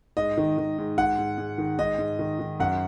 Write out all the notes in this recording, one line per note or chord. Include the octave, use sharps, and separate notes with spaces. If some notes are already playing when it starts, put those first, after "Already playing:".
G#2 D#5
D#3
D#3
G#2
G#2 F#5
G#2
G#2
D#3
G#2 D#5
G#2
D#3
D#3
F#2 F#5